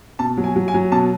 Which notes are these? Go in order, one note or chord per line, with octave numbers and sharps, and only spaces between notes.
B2 A5
F#3
G#5
F#3
G#5
F#3
B2 A5